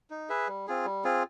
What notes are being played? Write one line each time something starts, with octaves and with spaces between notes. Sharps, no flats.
D#4
G#4 B4 E5
G3
C4 F4 G#4
G3
C4 F4 G#4